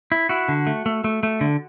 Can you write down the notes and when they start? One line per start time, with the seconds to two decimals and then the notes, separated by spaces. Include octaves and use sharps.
0.12 E4
0.29 E4 F#4
0.48 D3
0.67 A3
0.86 A3
1.04 A3
1.23 A3
1.41 D3